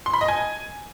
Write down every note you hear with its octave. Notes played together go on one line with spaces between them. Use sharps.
C6
B5
D#5
G#5